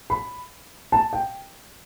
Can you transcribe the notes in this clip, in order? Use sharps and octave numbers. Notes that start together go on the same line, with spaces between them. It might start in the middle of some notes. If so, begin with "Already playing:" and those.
B5
A5
G5